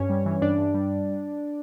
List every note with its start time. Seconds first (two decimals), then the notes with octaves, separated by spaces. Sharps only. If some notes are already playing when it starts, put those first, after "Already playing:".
Already playing: G2 C#4 C#5
0.10 G3
0.26 E3
0.42 G2 D4 D5
0.58 G2
0.75 G3